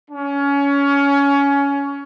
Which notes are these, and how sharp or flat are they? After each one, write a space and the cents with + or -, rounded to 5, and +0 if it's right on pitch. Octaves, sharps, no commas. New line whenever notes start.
C#4 +20